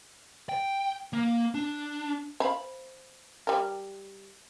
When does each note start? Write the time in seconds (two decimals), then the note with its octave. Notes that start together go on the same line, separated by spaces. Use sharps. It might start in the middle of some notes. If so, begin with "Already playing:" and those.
0.49 G5
1.13 A#3
1.54 D4
2.40 C5 F5 B5
3.47 G3 A#4